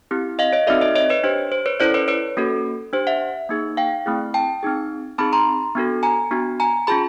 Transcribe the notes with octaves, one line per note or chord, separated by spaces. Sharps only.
C4 E4 G4
D#5 F5
C#5 D#5
C4 D#4 F#4 A4 D5 E5
C#5 D#5
C#5 D#5
B4 C#5
D4 G4 C5
C5
B4 C#5
C#4 E4 A4 C5 D5
B4 C#5
B4 C#5
A#3 C#4 F#4 A4
D4 G4 C5
E5 F#5
A#3 D#4 G#4
F5 G5
A3 C4 E4 G#4
G5 A5
C4 D#4 G#4
C4 D#4 G#4 A5 B5
A#5 C6
B3 D4 F#4 A4
G#5 A#5
B3 D4 F#4
G#5 A#5
C#4 F4 G#4 A5 B5